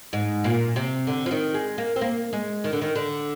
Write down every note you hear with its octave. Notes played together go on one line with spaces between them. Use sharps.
G#2
A#2
C3
D3
F3
D#3
G#3
A#3
C4
A#3
G#3
D#3
D3
D#3
D3